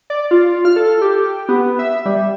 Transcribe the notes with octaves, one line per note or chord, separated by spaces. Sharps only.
D5
F4
F6
A4
G4
B3
E5
G3